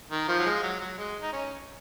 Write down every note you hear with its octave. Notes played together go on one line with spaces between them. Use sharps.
D#3
F3
F#3
G#3
F#3
F#3
G#3
D#4
C#4